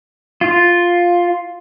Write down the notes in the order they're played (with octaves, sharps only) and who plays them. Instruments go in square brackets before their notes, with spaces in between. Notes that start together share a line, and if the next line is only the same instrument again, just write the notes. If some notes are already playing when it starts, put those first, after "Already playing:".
[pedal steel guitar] F4